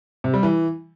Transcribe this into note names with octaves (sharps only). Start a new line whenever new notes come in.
C3
G3
E3